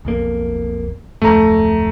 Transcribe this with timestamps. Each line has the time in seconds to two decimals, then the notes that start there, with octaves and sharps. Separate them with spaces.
0.05 B1 F2 A#3
1.22 D1 F2 A3 A#5